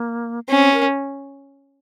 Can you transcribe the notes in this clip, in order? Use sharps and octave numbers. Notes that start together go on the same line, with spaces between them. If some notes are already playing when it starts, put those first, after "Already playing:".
Already playing: A#3
C4 C#4
A#4